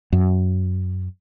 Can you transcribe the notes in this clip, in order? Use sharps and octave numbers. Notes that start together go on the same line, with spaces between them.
F#2